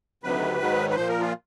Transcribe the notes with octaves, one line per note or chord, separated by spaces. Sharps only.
D2 C3 D#3 F#3 B4
G#2 D#3 F#3
B4
A#2 F3 C5
A#4
F4